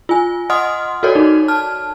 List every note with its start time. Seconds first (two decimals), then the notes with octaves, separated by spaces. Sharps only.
0.09 F4 G#5
0.50 D#5 F#5 C6 D#6 F6
1.03 F#4 A4 A#4 C#5 D5
1.15 D#4
1.48 A5 F6